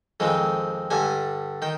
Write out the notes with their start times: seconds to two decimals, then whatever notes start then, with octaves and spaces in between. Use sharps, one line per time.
0.20 F2 D#3 G#3 C4
0.91 G2 D3 G3 G#5
1.62 D#3 G5